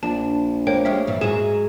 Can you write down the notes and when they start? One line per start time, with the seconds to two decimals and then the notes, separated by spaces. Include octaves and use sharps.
0.03 A#1 D4 A5
0.67 A#3 C5 C#5 G5
0.85 G#3 C#4 G4 E5
1.07 G2 E3
1.21 G#2 F#3 G#3 G#4 E7